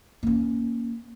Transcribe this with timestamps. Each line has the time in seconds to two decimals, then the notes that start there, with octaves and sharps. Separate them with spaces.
0.23 A#3 C#4